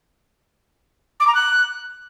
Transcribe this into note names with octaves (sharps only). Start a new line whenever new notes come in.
D6
A#5
F#6